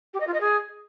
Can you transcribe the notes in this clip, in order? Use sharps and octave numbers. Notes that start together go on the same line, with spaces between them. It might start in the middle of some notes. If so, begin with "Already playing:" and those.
G4
D#5
F4
D#5
G#4